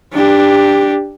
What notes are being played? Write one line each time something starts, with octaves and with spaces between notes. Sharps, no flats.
D4 G4